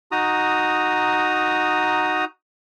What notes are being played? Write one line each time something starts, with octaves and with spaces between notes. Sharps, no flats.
D#4 F#4 A#5 D#6